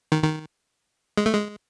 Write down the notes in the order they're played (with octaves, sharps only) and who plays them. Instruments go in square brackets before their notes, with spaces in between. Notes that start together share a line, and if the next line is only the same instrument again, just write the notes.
[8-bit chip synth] D#3
D#3
G#3
A3
G#3